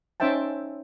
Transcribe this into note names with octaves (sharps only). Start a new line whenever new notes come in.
C#4 D#4 C5 E5 G5 A5